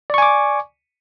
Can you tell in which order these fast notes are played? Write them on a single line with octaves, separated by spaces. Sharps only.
D5 C#6 G#5 D6